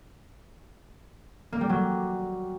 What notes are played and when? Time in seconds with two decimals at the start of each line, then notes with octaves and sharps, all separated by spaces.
1.52 A#3
1.61 G3
1.69 F#3